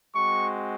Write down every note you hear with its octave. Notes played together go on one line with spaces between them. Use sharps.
G#3 C4 F#4 C#6